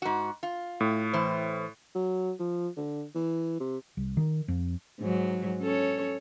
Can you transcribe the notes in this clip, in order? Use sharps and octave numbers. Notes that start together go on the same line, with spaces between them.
G#2 F#4
F4
A2
E3 C5
F#3
F3
D3
E3
C3
C2
D#3
F2
G#2 F#3
C#4 A4 C#5